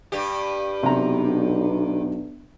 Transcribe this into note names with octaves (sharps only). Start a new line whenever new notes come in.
G2 G4
B1 C3 B3 D4 A#5